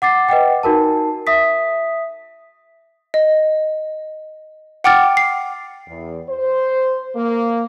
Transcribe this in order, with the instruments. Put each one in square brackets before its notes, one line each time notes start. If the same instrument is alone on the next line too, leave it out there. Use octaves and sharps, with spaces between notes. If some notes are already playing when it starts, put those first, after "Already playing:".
[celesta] F#5 D6 A6 C7
B4 D#5 F#5 G5
D#4 F#4 A#4 A5
E5 D#6 B6
[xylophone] D#5
F#5 G5 D6 F6 A6
C7
[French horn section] E2
C5
A#3